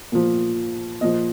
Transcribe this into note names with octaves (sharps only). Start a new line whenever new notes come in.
A#2 F3
A#2 F3 D#5